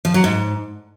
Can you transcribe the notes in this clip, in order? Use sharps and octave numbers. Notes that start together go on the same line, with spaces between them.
F3
F#3
G#2